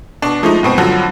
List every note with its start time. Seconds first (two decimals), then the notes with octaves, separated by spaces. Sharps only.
0.22 B2 D4
0.43 F3 G#3 A3 D#4
0.63 G2 B2 C4
0.78 G2 D3 F3 F#3